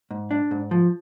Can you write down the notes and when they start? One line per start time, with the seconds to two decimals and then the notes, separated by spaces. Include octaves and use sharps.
0.11 G#2
0.31 D4
0.51 G#2
0.71 F3